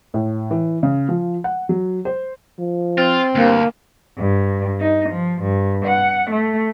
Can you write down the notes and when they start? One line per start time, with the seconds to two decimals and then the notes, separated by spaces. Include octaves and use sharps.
0.14 A2
0.51 E3
0.83 C#3
1.09 F3
1.44 F#5
1.69 F#3
2.05 C5
2.59 F3
2.98 C4 F4
3.35 D2 G2 A#3
4.18 G2
4.80 D#4
5.10 F3
5.42 G2
5.85 F#5
6.31 A3